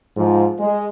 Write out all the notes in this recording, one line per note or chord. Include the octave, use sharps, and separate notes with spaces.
G#2 F3
G#3